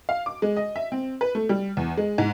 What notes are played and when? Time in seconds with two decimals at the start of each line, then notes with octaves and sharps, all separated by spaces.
0.09 F5
0.26 D6
0.42 G#3
0.57 D#5
0.76 E5
0.92 C4
1.21 B4
1.35 A3
1.49 G3
1.77 E2
1.97 G#3
2.18 G#2